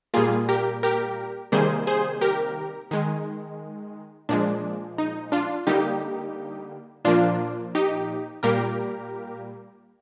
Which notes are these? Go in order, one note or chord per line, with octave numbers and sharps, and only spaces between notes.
A#2 G3 A#3 F4 G#4
G4 A#4
G4 A#4
C3 D#3 G3 A#3 G#4 C5
G#4 C5
G4 A#4
D#3 G#3
A#2 F3 G#3 D4
D#4
D4 F4
D3 G3 A#3 D#4 G4
A#2 F3 A#3 D4 F4
D#4 G4
A#2 G3 A#3 G4 A#4